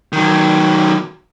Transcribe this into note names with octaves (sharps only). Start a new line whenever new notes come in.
D#3 F#3